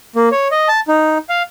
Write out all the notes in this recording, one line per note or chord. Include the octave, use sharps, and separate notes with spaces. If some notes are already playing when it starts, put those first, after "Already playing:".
A#3
C#5
D#5
A5
D#4
F5